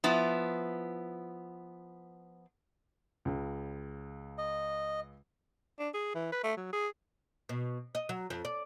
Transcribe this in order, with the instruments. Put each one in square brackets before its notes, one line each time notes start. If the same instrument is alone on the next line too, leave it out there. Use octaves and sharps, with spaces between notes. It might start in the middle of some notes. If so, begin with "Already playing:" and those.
[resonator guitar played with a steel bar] F3 B3 E4
[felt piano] C#2 C#3
[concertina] D#5
[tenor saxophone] D4
G#4
E3
B4
A3
F#3
G#4
[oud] B2
D#5
F#3
F2
D5